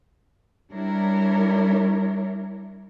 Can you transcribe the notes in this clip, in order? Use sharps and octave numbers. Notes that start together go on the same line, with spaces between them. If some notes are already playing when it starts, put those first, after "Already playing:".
G3 D4 E4 A#4 C#5